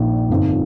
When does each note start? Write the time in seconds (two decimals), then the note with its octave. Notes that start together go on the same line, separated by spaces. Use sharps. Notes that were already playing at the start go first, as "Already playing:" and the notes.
Already playing: A#1 A#2 A#3 D#4
0.29 G1 F2 F3 D#4